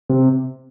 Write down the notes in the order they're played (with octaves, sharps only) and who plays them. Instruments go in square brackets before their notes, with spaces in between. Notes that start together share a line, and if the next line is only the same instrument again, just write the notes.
[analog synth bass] C3